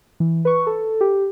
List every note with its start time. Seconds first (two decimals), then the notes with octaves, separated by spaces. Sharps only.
0.20 E3
0.45 B4 C#6
0.67 A4
1.01 G4